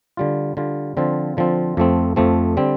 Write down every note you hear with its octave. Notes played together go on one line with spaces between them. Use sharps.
D3 G3 F4
D3 G3 F4
D3 F3 C4 F4
D3 F3 C4 F4
F2 F3 A3 C4
F2 F3 A3 C4
D3 G3 C4